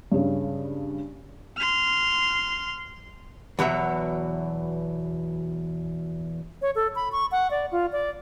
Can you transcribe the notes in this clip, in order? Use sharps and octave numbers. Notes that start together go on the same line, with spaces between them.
G2 C#3
C6 F6
E2 B2 F#3 E5
C#5
A4
B5
C#6
F#5
D5
F4
D5